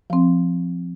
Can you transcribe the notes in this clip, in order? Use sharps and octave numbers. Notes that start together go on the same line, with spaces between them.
F3 C4